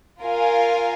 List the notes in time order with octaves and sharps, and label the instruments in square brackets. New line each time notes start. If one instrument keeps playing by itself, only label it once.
[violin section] F4 A#4 F5 G#5